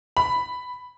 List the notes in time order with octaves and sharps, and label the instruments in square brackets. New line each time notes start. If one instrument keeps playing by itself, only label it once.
[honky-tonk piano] B5